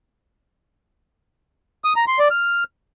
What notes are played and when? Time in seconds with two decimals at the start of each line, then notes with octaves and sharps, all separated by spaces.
1.85 D#6
1.96 A#5
2.08 C6
2.19 D5
2.31 F6